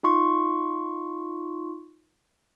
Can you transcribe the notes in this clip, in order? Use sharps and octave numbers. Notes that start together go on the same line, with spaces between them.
D#4 F4 C6 C#6